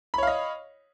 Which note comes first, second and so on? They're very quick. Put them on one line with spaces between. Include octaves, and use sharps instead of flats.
B5 C#5 F5 D#5